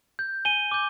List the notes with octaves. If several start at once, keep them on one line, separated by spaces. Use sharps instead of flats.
G6
G#5 D#7 G7
D6 G6